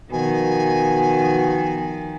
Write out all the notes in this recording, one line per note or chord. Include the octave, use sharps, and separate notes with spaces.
B2 D#3 F3 G#5